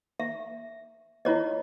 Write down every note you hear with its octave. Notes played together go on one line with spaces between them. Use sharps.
E5
E4 F4 C#5 D#5